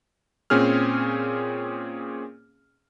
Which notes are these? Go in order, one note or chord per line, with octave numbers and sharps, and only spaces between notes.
A#2 C4 C#4 G#4 F6